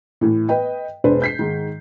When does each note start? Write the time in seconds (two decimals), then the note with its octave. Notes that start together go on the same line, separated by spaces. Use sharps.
0.21 A2 E3
0.49 B4 D#5 G5
1.04 E1 D4 B4 C5
1.22 G6 B6 C7
1.39 G#2 D#3